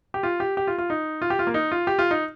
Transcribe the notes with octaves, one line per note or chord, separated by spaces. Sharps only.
G4
F4
G4
G4
F4
F4
D#4
F4
G4
F4
A#3
D#4
F4
G4
F4
D#4